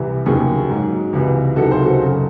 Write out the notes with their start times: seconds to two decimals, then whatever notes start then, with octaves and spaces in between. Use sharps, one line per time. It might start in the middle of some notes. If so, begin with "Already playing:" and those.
Already playing: C2 C3 E3
0.26 D#2 C#3 F#3 G#4
0.70 G#2 F#3
1.13 C#2 C3 E3
1.56 C#2 C3 D#3 F#3 F#4 A4
1.71 G#4 C5
1.86 F#4 A4
2.01 F#2 C#3 F#3